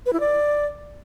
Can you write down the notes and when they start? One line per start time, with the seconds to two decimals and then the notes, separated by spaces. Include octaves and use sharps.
0.06 B4
0.13 E4
0.20 D5